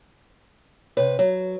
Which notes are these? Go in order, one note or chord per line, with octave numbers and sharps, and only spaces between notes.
C3 B4 C#5
F#3 C#5